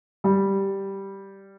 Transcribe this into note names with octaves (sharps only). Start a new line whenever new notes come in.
G3